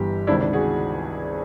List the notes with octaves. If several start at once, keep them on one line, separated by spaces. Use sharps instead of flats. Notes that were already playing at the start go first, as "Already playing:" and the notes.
Already playing: G1 G2 E3 G3 G4
C#2 C3 D#3 D4 E4
D4
F#4 G#4